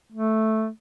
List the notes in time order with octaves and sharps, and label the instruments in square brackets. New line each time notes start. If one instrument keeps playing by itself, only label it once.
[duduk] A3